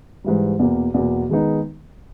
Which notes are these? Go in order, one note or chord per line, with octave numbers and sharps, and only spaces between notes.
G#2 E3 G3
E2 B2 A#3
E2 B2 A#3
D#3 G#3 B3 D#4